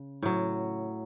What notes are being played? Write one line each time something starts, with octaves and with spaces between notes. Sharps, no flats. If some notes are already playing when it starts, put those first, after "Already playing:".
Already playing: C#3
A2 F#3